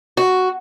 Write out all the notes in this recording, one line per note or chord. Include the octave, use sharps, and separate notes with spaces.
F#4